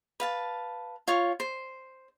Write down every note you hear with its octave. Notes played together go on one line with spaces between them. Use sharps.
B4 F5 A5
F4 C#5 C#6
C5